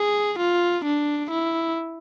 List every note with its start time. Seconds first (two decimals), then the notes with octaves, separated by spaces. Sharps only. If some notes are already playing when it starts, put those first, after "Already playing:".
Already playing: G#4
0.38 F4
0.85 D4
1.31 E4